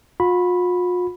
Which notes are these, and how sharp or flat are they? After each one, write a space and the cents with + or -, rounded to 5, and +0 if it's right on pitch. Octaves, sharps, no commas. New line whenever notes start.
F4 +45 B5 +0